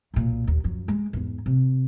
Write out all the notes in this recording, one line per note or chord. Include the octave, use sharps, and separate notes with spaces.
B1 A#2
D#2
F#2 F3
G#3
E2 G#2
C3